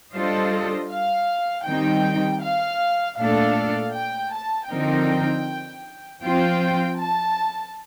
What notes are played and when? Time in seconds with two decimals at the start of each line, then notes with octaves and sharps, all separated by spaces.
0.13 G3 D4 F4 A4 C5 D#5
0.89 F5
1.66 D#3 G3 C4 D#4 G5
2.42 F5
3.18 A#2 A3 D4 A4 F5
3.94 G5
4.32 A5
4.70 D3 F3 C4 D#4 A#4 G5
6.22 F3 C4 F4 C5 G5
6.97 A5